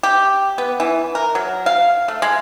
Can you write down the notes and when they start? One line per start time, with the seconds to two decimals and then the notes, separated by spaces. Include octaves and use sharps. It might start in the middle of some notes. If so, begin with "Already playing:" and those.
0.03 G4
0.58 B3
0.80 E3
1.15 A#4
1.35 F#3
1.66 F5
2.08 A3
2.22 G#3